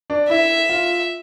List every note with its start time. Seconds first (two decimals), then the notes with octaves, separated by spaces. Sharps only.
0.10 D4
0.29 E4 E5
0.70 F4